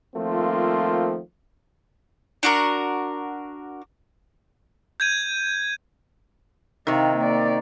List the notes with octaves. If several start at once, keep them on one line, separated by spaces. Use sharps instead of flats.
D#3 F3 A3 A#3 C4 F4
D4 F#4 A#4
G6 G#6 D#7
C3 D#3 D#4 F5
A#3 D5